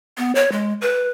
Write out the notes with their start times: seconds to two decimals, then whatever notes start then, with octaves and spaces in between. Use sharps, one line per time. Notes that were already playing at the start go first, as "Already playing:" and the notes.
0.17 B3
0.35 C#5
0.52 G#3
0.81 B4